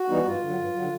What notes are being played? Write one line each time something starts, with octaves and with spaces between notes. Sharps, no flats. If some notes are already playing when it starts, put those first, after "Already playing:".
Already playing: F#4
E3 G3 B3 D#4
G2 F4
D3 F#3
G2
D3 F#3